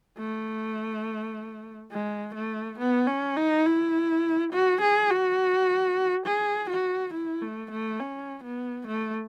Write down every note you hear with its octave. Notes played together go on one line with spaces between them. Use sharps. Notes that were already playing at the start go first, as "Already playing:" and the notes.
A3
G#3
A3
B3
C#4
D#4
E4
F#4
G#4
F#4
G#4
F#4
E4
A3
A3
C#4
B3
A3